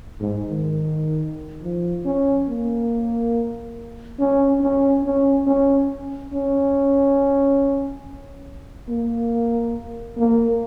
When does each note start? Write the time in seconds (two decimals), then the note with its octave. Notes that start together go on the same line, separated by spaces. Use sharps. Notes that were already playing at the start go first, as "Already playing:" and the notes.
0.21 G#2
0.49 D#3
1.62 F3
2.06 C#4
2.48 A#3
4.19 C#4
4.61 C#4
5.04 C#4
5.47 C#4
6.33 C#4
8.89 A#3
10.17 A#3